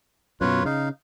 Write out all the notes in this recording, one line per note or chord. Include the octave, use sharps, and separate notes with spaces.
F#2 B2 F4 B4 C#5
C#3 D#4 F5